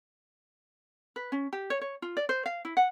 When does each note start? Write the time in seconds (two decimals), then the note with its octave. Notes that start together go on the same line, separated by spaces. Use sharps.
1.16 B4
1.32 C#4
1.53 G4
1.70 C#5
1.81 C#5
2.02 F4
2.17 D5
2.29 C5
2.46 F5
2.65 E4
2.77 F#5